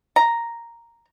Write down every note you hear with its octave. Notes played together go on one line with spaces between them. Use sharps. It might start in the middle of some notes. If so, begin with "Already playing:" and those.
A#5